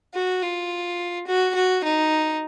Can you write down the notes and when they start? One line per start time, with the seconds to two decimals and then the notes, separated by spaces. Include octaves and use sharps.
0.14 F#4
0.42 F4
1.27 F#4
1.55 F#4
1.84 D#4